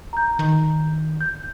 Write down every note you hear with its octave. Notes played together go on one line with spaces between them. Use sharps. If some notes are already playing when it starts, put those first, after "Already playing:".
A#5 G6
D#3
G6